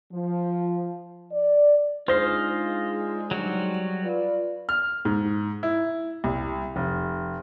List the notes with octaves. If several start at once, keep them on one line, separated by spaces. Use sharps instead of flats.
F3
D5
G#3 D4 D#4 F4 C5 D#5 F5
F#3 G3 F#4
F4 B4 D5
F6
G#2
E4
C2
F1